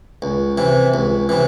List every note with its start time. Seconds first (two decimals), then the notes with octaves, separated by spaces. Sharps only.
0.22 C#2
0.58 C3 E3
0.94 C#2
1.29 C3 E3